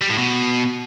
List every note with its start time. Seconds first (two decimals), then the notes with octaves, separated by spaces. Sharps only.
0.01 G3
0.10 A2
0.18 B2